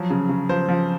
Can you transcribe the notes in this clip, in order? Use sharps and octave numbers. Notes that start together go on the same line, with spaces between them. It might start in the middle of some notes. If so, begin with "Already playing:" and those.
Already playing: F3 F#3
C#3
C#3
F3 C5
F3